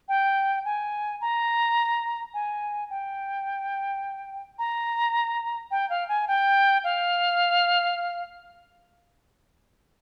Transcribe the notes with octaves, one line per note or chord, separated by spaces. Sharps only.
G5
G#5
A#5
G#5
G5
A#5
G5
F5
G#5
G5
F5